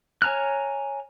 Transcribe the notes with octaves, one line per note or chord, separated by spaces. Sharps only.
C#5 G#5 A#5 F6 F#6